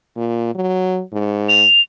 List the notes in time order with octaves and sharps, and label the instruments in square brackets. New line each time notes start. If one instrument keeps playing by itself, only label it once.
[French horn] A#2
F#3
G#2
[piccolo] F7